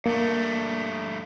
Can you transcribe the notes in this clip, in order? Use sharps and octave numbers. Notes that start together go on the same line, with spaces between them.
G2 A3 A#3